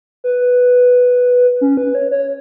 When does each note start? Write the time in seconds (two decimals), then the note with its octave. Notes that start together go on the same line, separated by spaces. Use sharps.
0.24 B4
1.61 C#4
1.77 B4
1.95 C#5
2.11 C#5